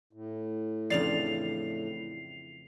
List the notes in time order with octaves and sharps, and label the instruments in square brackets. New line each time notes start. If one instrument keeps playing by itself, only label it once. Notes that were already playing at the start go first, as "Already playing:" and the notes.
[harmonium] A2
[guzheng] F2 C#3 E3 [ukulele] D4 D5 [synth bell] C7 F7